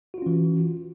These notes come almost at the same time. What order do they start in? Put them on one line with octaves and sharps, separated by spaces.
F#4 F4 C#4 E3